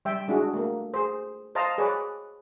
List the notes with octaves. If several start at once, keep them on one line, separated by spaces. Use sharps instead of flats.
G3 E5 G5
G#3 D4 E4 F#4 G#4
A3 A#3
G#4 C5
C5 D#5 F5 A5 A#5
G#4 B4 C#5 D5